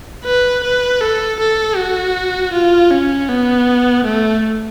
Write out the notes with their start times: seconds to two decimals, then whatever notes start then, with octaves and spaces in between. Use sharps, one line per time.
0.25 B4
0.64 B4
1.01 A4
1.39 A4
1.77 F#4
2.53 F4
2.91 C#4
3.29 B3
4.05 A3